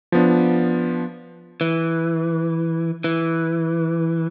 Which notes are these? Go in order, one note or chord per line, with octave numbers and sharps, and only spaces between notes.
F3 B3 D4
E3
E3